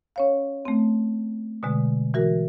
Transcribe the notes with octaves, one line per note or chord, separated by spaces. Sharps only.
C#4 C#5 F5
A3 C4
B2 D3 G#3
E3 F#4 A#4